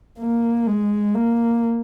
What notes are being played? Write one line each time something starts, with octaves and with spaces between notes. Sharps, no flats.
A#3
G#3
A#3